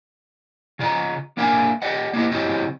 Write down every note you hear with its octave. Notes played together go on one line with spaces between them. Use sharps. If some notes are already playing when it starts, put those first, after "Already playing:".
C#3 F4 D5 D#5 A#5
A#3 D4 A#4 E5 F5 G#5
G4 D5 D#5 F#5
A#3 D4 E4 G4 D#5
C#3 F#3 C4 E4 G4 D#5